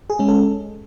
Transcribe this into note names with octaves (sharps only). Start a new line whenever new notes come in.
G#4
G#3 C#4
A4